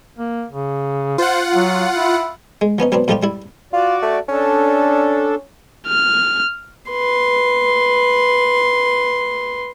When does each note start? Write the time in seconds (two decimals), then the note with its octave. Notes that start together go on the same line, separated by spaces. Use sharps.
0.18 A#3
0.51 C#3
1.18 F4 C5 F#5
1.55 F#3
1.96 E4
2.61 G#3
2.78 F3 B3 C#4 D#4
2.92 F#3 B3 C4 D4
3.08 A2 F3 G3 D#4 F4 G4
3.23 G3 E4
3.73 F4 F#4 D5
4.02 A3
4.29 C#4 D4 A4
5.87 F6
6.91 B4 C6